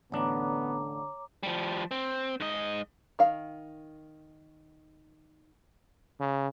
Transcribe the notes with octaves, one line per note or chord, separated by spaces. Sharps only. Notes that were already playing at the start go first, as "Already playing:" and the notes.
A1 D3 B3 D4 C#5 A#5 D6
F3 G3
C4
G#2 D#5
D#3 F5
C#3